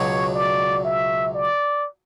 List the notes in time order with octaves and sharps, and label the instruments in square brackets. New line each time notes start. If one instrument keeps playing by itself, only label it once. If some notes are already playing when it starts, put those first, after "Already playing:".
Already playing: [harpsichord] C#2 B2 F#3 [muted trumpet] C#5
[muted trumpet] D5
E5
D5